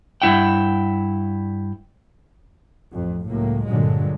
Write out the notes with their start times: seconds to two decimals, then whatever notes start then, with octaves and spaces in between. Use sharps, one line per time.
0.22 G2 G3 E4 F#5 G5
2.93 A1 F2
3.28 C#2 A2 F#3 A#3
3.68 G2 A#2 D3 F#3 G#3